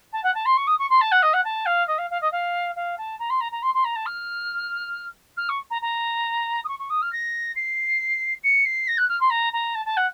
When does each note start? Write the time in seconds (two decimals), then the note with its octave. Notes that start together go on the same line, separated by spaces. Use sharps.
0.12 A5
0.23 F#5
0.34 A5
0.45 C6
0.57 C#6
0.67 D#6
0.78 C#6
0.90 C6
1.01 A5
1.11 F#5
1.22 D#5
1.33 F#5
1.44 A5
1.66 F5
1.87 D#5
1.98 F5
2.10 F5
2.21 D#5
2.32 F5
2.76 F5
2.97 A5
3.19 A#5
3.30 C6
3.40 A#5
3.52 A#5
3.62 C6
3.74 C6
3.84 A#5
3.95 A5
4.06 F6
5.37 F6
5.49 C#6
5.70 A#5
5.82 A#5
6.64 D#6
6.68 C#6
6.79 C#6
6.90 D#6
7.02 F6
7.12 A#6
7.55 C7
8.43 C#7
8.65 C7
8.87 A#6
8.97 F#6
9.09 F6
9.20 C6
9.30 A#5
9.53 A#5
9.74 A5
9.85 A5
9.97 F#5